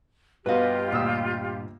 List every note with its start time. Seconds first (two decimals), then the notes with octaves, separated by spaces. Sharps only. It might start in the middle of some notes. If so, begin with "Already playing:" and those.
0.46 G2 B2 B3 F4 G4 B4 D#5 F5
0.92 D2 A#2 D#6 E6